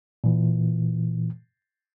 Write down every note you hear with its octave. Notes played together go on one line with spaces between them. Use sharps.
A#2 E3